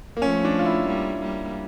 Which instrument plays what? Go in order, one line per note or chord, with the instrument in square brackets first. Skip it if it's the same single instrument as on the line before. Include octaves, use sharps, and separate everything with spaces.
[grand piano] A#3
[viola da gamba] F3 A3 [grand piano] C#4
[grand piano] D4
F4
E4
[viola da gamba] G3 A#3
G3 A#3